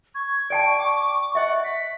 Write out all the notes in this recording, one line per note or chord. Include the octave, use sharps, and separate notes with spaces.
C#6 G#6
D5 G5 A5 D7
D6
D#5 E5 F#5
B6